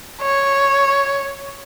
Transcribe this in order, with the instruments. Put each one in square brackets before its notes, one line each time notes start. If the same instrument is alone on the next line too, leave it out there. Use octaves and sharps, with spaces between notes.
[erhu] C#5